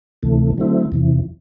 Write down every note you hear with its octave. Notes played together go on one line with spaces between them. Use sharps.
D2 C3 E3 A3
D3 F#3 A3 C4 E4
E2 C3 E3